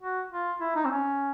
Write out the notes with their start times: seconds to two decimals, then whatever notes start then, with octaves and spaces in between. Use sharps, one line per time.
0.01 F#4
0.31 F4
0.61 E4
0.76 D#4
0.85 C4
0.90 C#4